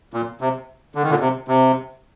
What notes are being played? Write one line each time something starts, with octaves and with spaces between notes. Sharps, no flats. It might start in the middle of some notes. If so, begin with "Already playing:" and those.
A#2
C3
D3
D#3
A#2 D3
C3
C3